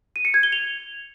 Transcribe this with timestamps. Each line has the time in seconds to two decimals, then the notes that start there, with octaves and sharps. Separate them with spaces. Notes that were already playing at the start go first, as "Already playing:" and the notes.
0.16 D#7
0.25 C#7
0.34 G#6
0.43 G7
0.52 F7